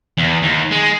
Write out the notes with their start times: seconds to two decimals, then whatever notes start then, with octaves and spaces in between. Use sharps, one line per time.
0.18 E2
0.42 D#2
0.71 G#3